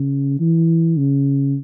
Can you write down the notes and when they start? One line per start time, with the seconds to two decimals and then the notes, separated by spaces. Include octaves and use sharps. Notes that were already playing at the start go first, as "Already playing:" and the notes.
Already playing: C#3
0.40 E3
0.97 C#3